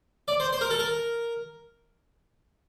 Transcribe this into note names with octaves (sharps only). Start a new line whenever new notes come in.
D5
C5
C5
A#4
A4
A#4